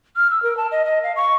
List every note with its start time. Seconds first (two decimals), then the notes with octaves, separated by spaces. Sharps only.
0.16 F6
0.31 E6
0.43 A#4
0.57 A5
0.71 D#5
0.85 D#5
1.03 F5
1.16 C#6